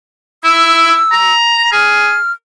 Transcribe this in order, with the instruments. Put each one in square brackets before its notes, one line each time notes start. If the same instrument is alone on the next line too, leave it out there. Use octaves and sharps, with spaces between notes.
[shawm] E4 [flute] E6
[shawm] A#5
[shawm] G#4 [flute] F6